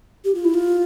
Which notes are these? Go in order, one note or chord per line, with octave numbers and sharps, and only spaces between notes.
G4
F4
E4
F4